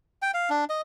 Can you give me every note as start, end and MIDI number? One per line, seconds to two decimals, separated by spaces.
0.22 0.31 79
0.34 0.50 77
0.50 0.65 62
0.70 0.81 75